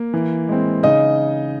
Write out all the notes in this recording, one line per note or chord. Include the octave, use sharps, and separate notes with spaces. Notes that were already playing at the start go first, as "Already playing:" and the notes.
Already playing: A#3
E3
G#3 C4
C#3 D#4 D#5